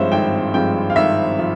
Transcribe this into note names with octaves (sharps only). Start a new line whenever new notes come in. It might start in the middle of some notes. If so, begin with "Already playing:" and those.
Already playing: G#1 G2 F3 G#3 C4 C5 C#5 E5
G#1 G5
G2 F3 G#3 C4 G5
F5
G#1 E5
F3